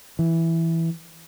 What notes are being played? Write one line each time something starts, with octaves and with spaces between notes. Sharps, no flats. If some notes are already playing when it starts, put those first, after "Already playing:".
E3